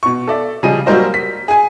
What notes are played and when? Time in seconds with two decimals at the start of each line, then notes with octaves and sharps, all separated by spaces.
0.03 B2 C#6
0.28 A4 D5 E5
0.63 C#3 F3 G3 G#4 D#5 D#7
0.86 F#3 G3 A#3 A#4 C5 D#5
1.14 B6
1.48 G#4 G#5